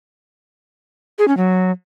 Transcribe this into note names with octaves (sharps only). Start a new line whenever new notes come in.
G#4
C#4
F#3